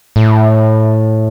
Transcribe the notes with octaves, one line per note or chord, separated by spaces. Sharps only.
A2